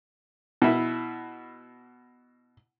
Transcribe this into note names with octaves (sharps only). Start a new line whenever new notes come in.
B2 E4